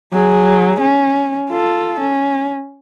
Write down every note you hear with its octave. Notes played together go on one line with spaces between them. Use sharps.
F#3 G#4
C#4
F4 A4
C#4